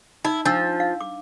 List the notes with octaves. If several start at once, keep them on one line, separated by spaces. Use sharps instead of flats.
D#4 E4
F3 D4 E6
F5
D6